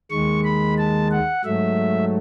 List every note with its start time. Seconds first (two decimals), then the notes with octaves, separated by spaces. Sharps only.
0.10 D#2 D#3 G#3 C#6
0.44 B5
0.78 A5
1.11 F#5
1.44 G#2 F#3 A3 E5